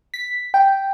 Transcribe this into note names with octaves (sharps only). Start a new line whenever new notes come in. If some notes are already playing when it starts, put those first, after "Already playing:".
B6
G5